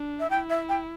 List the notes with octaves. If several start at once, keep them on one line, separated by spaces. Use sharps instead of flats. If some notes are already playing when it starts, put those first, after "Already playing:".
Already playing: D4
E5
E4 G5
E5
G5